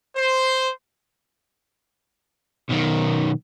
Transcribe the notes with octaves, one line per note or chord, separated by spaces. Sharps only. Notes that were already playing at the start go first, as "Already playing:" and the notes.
C5
B1 D#3